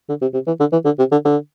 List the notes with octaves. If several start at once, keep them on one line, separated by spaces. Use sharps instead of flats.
D3
C3
C3
E3
D3
E3
D3
C3
D3
D3